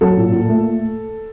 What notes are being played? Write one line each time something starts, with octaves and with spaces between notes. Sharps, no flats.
F#3 A4
A#2
A#2
A3